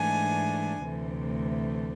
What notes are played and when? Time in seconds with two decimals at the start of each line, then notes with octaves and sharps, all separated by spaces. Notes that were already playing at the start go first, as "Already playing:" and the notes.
Already playing: G#2 E3 A3 D4 G#5
0.86 D2 C3 E3 A3